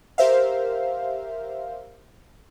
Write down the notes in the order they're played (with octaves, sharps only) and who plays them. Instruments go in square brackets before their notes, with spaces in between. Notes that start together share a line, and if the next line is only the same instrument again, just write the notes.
[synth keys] G4 A#4 C5 E5 F5